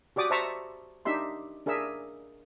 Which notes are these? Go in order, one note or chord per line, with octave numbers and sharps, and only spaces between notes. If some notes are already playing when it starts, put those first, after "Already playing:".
F#4 G4 D5 D6 D#6
C5 E5 A5 A#5 C#6
D4 D#4 G4 E5 C6
D4 G#4 A#4 E5 E6